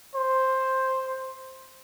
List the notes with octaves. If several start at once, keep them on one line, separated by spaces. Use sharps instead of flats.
C5